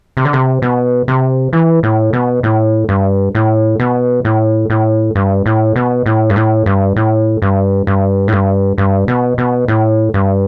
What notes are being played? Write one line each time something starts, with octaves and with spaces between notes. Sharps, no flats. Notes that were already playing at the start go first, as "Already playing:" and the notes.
C3
D3
C3
B2
C3
E3
A2
B2
A2
G2
A2
B2
A2
A2
G2
A2
B2
A2
G2
A2
G2
A2
G2
G2
A2
G2
G2
B2
B2
A2
G2